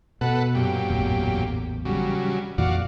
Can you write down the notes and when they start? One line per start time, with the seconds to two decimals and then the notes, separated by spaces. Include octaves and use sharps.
0.21 B2 A4 B4 F#5
0.55 F#2 A#2 G4
0.89 A1 E2
1.85 C#3 F#3 G3
2.58 F2 A#2 E3 F#4 D5 F5